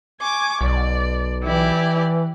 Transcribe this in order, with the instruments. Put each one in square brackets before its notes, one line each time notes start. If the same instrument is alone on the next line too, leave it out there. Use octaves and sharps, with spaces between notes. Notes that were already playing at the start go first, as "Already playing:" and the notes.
[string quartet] G#5 C#6 D6
[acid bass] B1 [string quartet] D5
[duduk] E3 [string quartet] E4 G4 D5